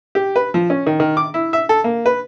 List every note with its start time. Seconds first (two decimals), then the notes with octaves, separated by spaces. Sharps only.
0.15 G4
0.36 B4
0.54 F3
0.70 C#4
0.86 D#3
1.00 D#3
1.17 D6
1.34 E4
1.53 E5
1.69 A4
1.84 A#3
2.06 B4